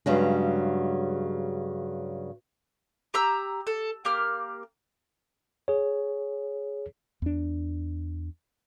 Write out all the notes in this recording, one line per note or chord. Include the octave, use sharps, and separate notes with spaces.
G2 C#3 F#3 G#3
G4 A#5 E6
A4
A#3 G4 F6
G#4 C#5
E2 D4